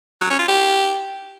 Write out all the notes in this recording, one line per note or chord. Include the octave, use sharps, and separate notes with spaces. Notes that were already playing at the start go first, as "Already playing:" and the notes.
F#3
C#4
F4
G4